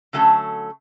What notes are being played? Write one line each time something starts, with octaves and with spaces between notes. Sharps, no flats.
D3 F#3 A3 C#4 A4